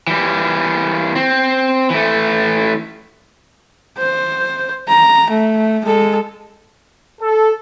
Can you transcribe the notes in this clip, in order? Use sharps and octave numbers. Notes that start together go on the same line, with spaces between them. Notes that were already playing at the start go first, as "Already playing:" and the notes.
E3 G3
C4
E3 A3
C5
A#5
A3
G#3 A4
A4